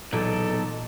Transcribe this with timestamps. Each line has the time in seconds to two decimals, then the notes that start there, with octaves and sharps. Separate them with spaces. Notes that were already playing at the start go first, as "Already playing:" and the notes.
0.13 B1 E2 A#2 D#4 A4